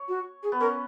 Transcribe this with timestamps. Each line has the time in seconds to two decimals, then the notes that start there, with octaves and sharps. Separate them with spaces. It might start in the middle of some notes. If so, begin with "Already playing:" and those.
Already playing: C#5
0.08 F#4
0.43 G#4
0.52 B3
0.60 C#4 A#4